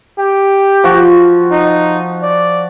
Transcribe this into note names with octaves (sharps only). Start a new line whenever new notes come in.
G4
F3 F#4
D#4
D5